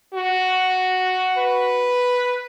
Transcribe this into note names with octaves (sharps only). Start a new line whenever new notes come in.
F#4
B4